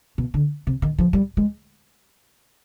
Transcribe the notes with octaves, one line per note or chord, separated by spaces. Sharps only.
B2
D3
C3
D#3
F3
G3
G#3